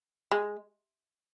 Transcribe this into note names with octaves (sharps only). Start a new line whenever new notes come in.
G#3